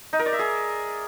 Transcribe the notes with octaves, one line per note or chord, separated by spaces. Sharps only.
D#4
A#4
D5
E5
G#4